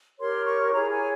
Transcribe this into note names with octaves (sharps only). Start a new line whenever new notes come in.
G4 A#4 C#5 C6
C#6
E4 G#4 C#5 A#5
G#5